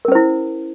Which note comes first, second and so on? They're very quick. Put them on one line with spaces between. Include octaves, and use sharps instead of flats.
A#4 C#4 C5 E4